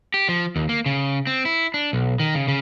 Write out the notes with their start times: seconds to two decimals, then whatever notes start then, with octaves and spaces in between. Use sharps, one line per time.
0.14 G4
0.29 F3
0.56 D#2
0.69 A#3
0.86 C#3
1.27 C4
1.45 E4
1.74 D4
1.93 B1
2.20 D#3
2.35 C#3
2.48 C#3